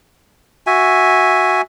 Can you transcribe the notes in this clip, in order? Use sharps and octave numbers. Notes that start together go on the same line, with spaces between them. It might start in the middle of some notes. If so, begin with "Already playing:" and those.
F#4 E5 G#5